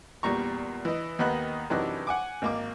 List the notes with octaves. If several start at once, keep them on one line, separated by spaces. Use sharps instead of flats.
E2 A#2 G3 A#5 C#6
E3 D#5
D#2 D#3 B3 D#5 B5 F#6
F#2 C3 E3 D4 D#4 F#6
F#5 G#5 D6
G#1 A#3 D6